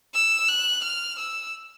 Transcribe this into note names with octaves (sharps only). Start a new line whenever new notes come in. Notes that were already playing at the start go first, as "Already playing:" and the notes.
E6
F#6
F6
E6